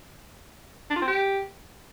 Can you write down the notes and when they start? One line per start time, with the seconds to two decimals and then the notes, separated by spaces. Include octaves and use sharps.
0.90 D4
0.96 F4
1.02 C4
1.08 G4